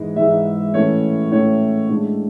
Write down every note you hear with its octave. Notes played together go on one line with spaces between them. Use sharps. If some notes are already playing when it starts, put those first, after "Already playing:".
Already playing: G#2 E3 G#3
G#2 E3 G#3 E5
A2 E3 A3 C#4 C#5
A2 E3 A3 C#4 C#5
A2 G#3 D4